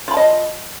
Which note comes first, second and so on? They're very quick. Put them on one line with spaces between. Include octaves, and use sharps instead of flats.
F4 B5 A5 D#5